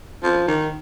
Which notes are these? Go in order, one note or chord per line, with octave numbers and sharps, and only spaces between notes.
F3
D#3